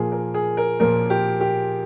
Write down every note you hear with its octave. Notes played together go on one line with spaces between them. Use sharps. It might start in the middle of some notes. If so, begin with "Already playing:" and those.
Already playing: A#2 F3 A#3 G#4
A#4
G#4
A#4
A#2 F3 A#3 A#4
G4
G4